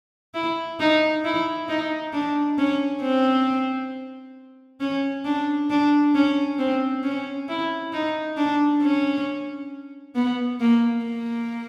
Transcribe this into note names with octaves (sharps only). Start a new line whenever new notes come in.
E4
D#4
E4
D#4
D4
C#4
C4
C#4
D4
D4
C#4
C4
C#4
E4
D#4
D4
C#4
B3
A#3
A#3